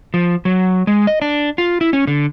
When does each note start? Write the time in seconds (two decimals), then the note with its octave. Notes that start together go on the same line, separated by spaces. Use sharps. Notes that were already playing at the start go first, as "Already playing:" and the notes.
0.14 F3
0.45 F#3
0.87 G#3
1.07 D#5
1.22 D4
1.58 F4
1.81 E4
1.93 C#4
2.07 D3